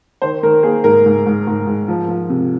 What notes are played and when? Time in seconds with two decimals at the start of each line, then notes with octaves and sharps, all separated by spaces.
0.22 D#3 C5
0.43 D#3 A#4
0.63 A#3 G#4
0.84 G#2 A#4
1.05 G#2
1.26 G#2
1.47 G#2
1.67 G#2
1.88 F3
2.08 F3
2.29 C3